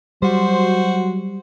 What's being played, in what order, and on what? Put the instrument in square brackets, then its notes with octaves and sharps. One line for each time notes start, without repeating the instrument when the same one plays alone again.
[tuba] F#3 [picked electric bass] G3 [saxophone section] F#4 C5